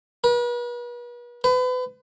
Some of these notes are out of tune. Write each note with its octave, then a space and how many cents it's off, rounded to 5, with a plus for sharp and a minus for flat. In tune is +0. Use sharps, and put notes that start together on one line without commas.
B4 -40
B4 +35